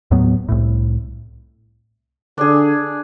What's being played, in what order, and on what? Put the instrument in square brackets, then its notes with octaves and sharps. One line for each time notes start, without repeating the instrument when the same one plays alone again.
[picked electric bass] D#2 A2 F#3 B3
C2 A2
[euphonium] D3 [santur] D4 G#4